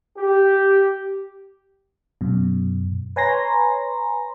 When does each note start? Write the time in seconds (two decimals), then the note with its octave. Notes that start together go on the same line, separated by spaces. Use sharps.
0.18 G4
2.21 F#2 B2
3.16 B4 C#5 G#5 A#5 C6 A#6